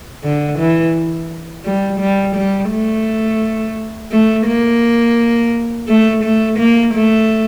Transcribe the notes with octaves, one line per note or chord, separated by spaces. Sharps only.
D3
E3
G3
G3
G3
A3
A3
A#3
A3
A3
A#3
A3